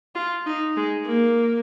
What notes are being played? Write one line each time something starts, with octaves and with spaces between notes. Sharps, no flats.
F4
D#4
G#3
A#3